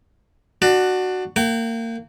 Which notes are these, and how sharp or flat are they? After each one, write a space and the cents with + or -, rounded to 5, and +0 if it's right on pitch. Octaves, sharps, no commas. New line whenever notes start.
D4 +20 F#4 +0
A#3 -30 G5 -45